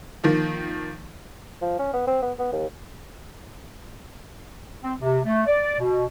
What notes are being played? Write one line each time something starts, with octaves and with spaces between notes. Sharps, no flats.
D#3 F3 A#3
F3
C#4
B3
C4
B3
B3
D#2
C4
C3
A3
D5
B2